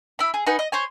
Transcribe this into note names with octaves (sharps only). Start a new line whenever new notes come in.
E4 B5
G#4
D#4 B4 F#5 G#5
D#5
C5 C#5 G#5